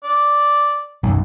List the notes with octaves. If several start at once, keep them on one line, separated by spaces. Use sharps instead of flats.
D5
B1 F#2